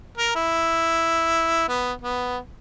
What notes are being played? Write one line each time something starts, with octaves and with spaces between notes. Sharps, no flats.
A#4
E4
B3
B3